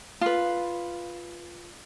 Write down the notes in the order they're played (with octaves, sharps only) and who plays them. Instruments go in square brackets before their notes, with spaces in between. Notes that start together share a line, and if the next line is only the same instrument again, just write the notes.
[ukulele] F4 B4